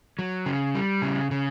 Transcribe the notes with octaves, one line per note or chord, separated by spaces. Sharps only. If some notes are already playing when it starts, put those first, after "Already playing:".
F#3
C#3
G3
C#3
C#3